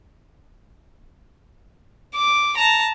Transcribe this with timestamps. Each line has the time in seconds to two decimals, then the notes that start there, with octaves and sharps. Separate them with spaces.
2.15 D6
2.57 A5 A#5